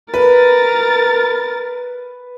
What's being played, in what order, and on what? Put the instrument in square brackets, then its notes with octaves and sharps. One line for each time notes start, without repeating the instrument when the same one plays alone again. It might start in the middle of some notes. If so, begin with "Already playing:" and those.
[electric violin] A#4 A6 [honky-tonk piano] B4